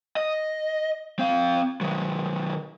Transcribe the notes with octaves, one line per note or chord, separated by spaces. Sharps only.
D#5
C4 F5
D#3 F#3